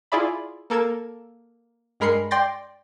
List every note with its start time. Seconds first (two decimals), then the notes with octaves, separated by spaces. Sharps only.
0.12 E4 F4 G#4 D5 E5 B5
0.70 A#3 A4 A#4 G#6 E7
2.00 G2 G#3 A#4 B5 C7 C#7
2.31 D5 G5 C6 G6 A6 A#6